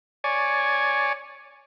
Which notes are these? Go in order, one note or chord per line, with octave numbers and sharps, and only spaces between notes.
C#5 D5 G#5